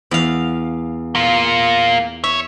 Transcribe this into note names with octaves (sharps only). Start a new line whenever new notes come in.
E2 F5
A#3 F4
C#5 E5